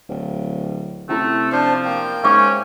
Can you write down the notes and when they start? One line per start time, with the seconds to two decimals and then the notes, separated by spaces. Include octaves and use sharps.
0.09 D1
1.09 C3 A3 C#4 E4
1.52 F3 D4 C5
1.85 A#3 G5
2.24 G#2 C#4 E5 C#6 D6